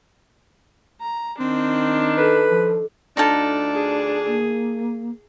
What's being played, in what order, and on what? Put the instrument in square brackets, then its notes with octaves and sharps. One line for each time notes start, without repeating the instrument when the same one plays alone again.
[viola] A#5
[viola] D#3 D4 [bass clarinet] C4
[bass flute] A4 [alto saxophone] B4
[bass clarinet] F3
[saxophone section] D2 D4 [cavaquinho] D#4 F4 A4
[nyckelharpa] G#4
[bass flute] A#3